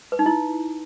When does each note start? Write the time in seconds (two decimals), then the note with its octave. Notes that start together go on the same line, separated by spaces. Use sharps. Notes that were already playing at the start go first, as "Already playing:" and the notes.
0.12 B4
0.19 D#4
0.26 E4